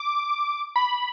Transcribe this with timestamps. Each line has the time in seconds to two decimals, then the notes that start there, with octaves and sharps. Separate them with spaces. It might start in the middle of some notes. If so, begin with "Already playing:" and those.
Already playing: D6
0.76 B5